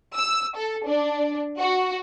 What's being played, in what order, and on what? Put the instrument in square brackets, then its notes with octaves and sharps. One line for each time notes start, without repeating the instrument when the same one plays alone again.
[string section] E6
A4
D4
F#4